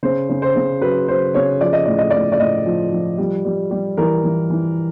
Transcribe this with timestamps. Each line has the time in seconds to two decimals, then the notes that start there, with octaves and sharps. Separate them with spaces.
0.03 C#3 C5
0.29 C#3
0.42 C5
0.56 C#3
0.82 F#3 B4
1.08 F#3 C5
1.34 C#3 C#5
1.61 F3 D5
1.73 D#5
1.85 A2 D5
1.98 D#5
2.10 A2 D5
2.32 D5
2.39 A2 D#5
2.66 F3
2.92 F3
3.18 G3
3.45 G3
3.71 G3
3.97 E3 A#4
4.24 E3
4.50 E3